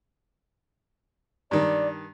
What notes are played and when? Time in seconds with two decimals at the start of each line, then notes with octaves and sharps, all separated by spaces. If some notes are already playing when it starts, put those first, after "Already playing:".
1.51 G2 D#3 D5